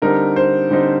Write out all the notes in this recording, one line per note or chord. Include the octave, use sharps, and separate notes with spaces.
D3 G3 C4 D#4 A#4
C5
D3 G3 C4 D#4